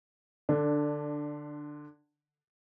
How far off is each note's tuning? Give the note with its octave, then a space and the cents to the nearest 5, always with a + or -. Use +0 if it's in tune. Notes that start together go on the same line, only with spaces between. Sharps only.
D3 +15 D4 +0